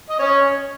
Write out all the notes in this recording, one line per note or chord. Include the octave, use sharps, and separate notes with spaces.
D#5
C#4 C#5